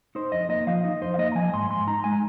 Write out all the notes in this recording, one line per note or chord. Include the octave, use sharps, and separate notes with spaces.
D#4 C5
F2 D#5
A#3 D#5
F3 F5
D#4 D#5
F2 C5
F5
A#3 D#5
A#5
F3 G#5
G#2 C6
G#2 C6
D#4 A#5
G#3 G#5